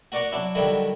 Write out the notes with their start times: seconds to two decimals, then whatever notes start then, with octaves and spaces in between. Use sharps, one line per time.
0.12 F#4 A#4 D5 F#5 A#5
0.32 F#3 D4 E4
0.55 D3 D#3 F#3 G3 E4